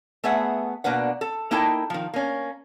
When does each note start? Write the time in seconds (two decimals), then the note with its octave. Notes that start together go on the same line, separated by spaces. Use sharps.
0.24 A3 B3 G#4 B4 E5 F#5
0.84 B2 A#3 D4 B4 F#5
1.21 A4
1.51 A#3 D#4 E4 A4 G5 A5
1.90 D#3 F3
2.14 A#3 C#4